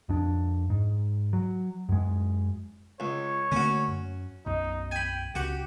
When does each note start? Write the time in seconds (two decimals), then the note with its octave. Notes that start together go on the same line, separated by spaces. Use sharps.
0.09 F2 D4
0.70 G#2
1.33 F#3
1.89 F#2 G#3
3.00 C#2 C#5
3.52 D3 A3 A#3 C#4 F#4
3.88 F#2
4.46 B1 F#2 D#4
4.91 G5 G#5 B5
5.35 C#2 F#4 G4 F#5